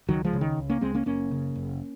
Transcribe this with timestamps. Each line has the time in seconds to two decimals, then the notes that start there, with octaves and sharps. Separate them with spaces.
0.08 C#2 D#3 F#3
0.25 F3 G#3
0.33 C#3
0.41 D#3
0.58 C#2
0.70 A#3 C#4
0.81 C#2 G#3 C4
0.95 A#3 C#4
1.06 F#1 A#3 C#4
1.31 C#3
1.56 F#1